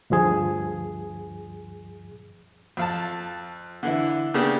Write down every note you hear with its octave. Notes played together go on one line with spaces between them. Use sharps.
D2 G2 F3 G#4
F2 F5 A5
D3 E3 E4
C#3 A#3 B3 D4 G4 G#4